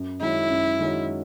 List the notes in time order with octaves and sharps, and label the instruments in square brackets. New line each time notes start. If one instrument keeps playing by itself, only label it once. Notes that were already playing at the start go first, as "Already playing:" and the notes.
Already playing: [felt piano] F#2
[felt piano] D#3 G#3 C#4 F#4 [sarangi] E4
[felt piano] F#2
D#3 G#3 C#4 F#4